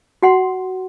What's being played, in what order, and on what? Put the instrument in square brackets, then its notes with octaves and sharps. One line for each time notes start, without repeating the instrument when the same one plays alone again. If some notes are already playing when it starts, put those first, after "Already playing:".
[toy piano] F#4 F#5 C6